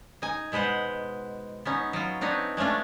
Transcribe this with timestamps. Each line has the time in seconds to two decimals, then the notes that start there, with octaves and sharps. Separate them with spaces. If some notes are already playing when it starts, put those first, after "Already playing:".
0.22 D#4 G#5
0.52 B2 G#3 B4 C5 F#5
1.65 B3 C#4 D#4
1.93 F#3 F4
2.21 C4 D4 D#4 B4 C#5
2.57 G#3 A3 C#4 D4 F4